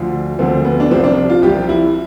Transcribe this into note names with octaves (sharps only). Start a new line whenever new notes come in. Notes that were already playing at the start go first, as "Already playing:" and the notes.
Already playing: D2 D3 F3
D2 D3 F3 C4
B3
D4
C2 C3 F3 C4
D4
F4
C2 C3 F3 G4
E4